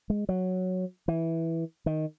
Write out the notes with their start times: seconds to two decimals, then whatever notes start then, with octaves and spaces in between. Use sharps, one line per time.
0.10 G#3
0.29 F#3
1.08 E3
1.86 D#3